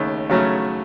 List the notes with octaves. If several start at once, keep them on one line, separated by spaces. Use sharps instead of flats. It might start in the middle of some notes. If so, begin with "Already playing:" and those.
Already playing: D#2 C#3 A3
C#3 F#3 A3 C#4